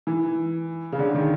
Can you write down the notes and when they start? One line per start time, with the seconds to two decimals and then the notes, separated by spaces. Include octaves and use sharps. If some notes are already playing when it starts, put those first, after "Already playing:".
0.07 E3
0.92 C#3
0.99 D3
1.14 D#3